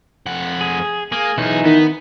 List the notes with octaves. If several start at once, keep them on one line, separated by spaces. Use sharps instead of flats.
F2 F#5
G#4
A#3 G#4
B1 E3 D#4 G#4
D#3 B3